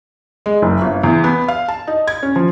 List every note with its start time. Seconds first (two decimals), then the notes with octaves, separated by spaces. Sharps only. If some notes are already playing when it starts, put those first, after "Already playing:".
0.46 G#3
0.62 F#1
0.81 G1
1.04 E2
1.24 B3
1.48 F5
1.68 A5
1.87 D#4
2.07 G#6
2.23 C#4
2.36 F3